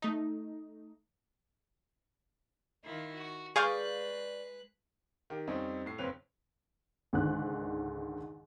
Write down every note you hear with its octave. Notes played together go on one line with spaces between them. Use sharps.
A3 D#4
D#3 E4 F4
F#4
G#3 G#4 B4 D5 F5 C#6 F#6 G6
D#3 G4
F2 G3 C4 C#4 D#4
A2 C7
F#1 F2 C4 B4 C#5 F7
C#2 G#2 D3 D#3 F#6